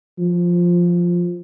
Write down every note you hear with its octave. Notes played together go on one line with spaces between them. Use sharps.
F3